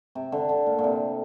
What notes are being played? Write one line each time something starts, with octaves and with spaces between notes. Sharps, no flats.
C3
D3
D3
A#2
A#2
C3